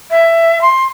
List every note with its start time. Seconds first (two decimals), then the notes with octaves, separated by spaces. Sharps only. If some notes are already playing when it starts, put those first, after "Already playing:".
0.11 E5
0.61 C6